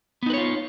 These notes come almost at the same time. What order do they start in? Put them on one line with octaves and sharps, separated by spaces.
B3 D#4 B4 C#5 F4